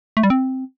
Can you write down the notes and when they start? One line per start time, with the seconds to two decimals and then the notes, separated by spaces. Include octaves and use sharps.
0.17 A3
0.23 G3
0.30 C4